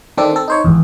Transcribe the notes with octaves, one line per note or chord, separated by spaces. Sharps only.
D#3 C4 D4 A4
C4 A4
D#4 C5 C#5
G#1 E2